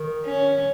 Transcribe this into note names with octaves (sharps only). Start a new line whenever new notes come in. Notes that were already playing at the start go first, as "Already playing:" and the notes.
Already playing: D#3
C#4